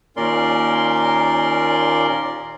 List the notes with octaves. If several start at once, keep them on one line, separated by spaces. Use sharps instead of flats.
D#2 A#2 C#4 A#4 D5 C6